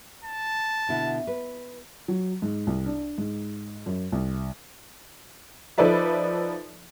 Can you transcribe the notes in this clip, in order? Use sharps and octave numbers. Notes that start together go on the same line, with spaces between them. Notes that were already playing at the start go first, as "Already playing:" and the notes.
A5
B2 D3 E4
B4
F#3
G#2
C2
D4
G#2
F#2
C2
F3 D#4 A4 B4 D5 E5